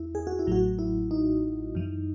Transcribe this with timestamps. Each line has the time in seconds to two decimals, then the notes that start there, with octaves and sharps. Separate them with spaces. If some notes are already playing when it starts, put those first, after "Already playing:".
Already playing: E2 E4
0.15 G#4
0.27 F#4
0.39 E4
0.47 A1 A2 F#3 F#4
0.79 E4
1.11 D#4
1.75 F#2 E3